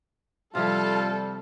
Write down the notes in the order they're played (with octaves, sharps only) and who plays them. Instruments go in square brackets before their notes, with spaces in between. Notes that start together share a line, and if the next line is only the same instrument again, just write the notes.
[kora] C3 F3 E4 [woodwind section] G3 [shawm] F4 [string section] A4